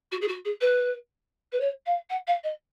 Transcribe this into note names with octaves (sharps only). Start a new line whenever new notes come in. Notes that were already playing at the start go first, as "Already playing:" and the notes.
F#4
G#4
F#4
G#4
B4
B4
C#5
F5
F#5
F5
D#5